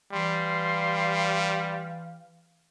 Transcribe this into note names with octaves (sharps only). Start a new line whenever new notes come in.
E3 G3 F5 C6